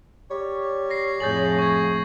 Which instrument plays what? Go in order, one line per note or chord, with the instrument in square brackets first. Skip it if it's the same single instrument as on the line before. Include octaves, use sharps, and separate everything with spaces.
[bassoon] G3 [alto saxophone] C#5
[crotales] A#6 C7
[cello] F2 A2 [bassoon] G#4 [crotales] G6 A6 F#7
[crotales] C#6 G#6